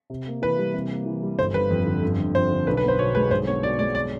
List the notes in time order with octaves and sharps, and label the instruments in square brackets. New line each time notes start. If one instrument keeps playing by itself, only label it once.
[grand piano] C3
A#3
[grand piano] E3 [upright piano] B4
[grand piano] G3
C3
A#3
E3
G3
[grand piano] G1 [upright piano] C5
[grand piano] G1 [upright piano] B4
[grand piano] F2
D3
G1
G1
[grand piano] F2 [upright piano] C5
[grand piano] D3
[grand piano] B1 [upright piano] B4
[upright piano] B4
[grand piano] B3 [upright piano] C5
[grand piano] B2 [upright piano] C#5
[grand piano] G#3 [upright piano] B4
[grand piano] B1 [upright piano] C5
[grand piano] B3 [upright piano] C#5
[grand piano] B2 [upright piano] D5
[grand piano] G#3 [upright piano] D5
[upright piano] D5